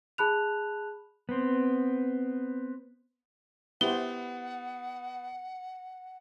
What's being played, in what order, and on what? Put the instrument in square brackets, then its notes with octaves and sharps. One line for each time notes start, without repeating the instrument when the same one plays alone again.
[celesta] G#4 A5 B5 F#6 F7
[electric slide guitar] B3 C4
[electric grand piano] B3 [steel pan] E4 G4 C5 [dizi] F#5 [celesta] G7